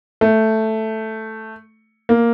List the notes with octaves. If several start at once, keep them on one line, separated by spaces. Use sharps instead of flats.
A3
A#3